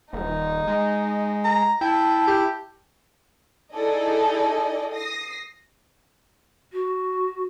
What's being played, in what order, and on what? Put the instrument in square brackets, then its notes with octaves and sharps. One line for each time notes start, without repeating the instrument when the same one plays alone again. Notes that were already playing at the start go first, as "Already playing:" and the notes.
[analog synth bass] D#1 [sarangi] D#4
[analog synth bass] G#3
[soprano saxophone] A#5
[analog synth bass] E4 [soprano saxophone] G5 [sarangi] A5
[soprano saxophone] G4
[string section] D#4 E4 G#4 A4 D5 D#5
D#6 A#6 C7
[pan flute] F#4